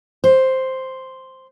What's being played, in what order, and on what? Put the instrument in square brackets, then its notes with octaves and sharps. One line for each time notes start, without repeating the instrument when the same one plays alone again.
[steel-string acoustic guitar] C5